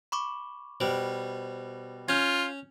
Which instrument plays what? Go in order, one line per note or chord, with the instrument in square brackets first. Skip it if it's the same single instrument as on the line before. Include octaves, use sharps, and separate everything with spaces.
[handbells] B5 C#6 D6
[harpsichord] B2 G3 [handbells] C5
[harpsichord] C#4 [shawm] F4 [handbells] G6 G#6